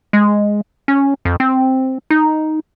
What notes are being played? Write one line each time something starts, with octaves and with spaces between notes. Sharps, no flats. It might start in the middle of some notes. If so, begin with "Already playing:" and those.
G#3
C#4
F2
C4
D#4